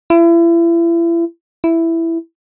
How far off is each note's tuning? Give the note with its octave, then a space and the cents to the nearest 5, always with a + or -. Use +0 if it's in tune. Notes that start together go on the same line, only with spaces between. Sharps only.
E4 +35
E4 +5